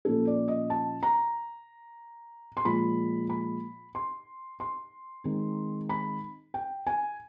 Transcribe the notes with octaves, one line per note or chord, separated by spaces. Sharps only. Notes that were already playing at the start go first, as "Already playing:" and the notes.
A#2 F3 A#3 C#4 A4
D5
D#5
A5
A#5
C6
A#2 F3 G#3 B5
B5
C6
C6
D#3 G#3 C4 D#4
B5
G5
G#5